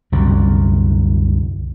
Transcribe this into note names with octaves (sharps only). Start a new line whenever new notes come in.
C2 F#2 D3